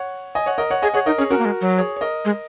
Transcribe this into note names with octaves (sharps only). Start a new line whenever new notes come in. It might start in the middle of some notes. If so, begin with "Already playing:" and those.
Already playing: C#5 F#5
D#5 G#5
C#5 F#5
A#4 D#5
C#5 F#5
G#4 D#5 G#5
G#4 C#5 F#5
D#4 A#4 D#5
C#4 G#4 C#5
C#4 F#4 A#4
A#3
G#3
F#3
G#4 C#5
C#5
A#4 D#5
G#3